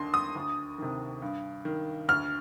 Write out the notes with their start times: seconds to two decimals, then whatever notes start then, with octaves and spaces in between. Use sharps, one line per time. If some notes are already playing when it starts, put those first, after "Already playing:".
Already playing: D#2 D3 C6
0.14 D#6
0.35 D2
0.78 C3 D#3
1.22 G2
1.65 D#3
2.08 D2 F6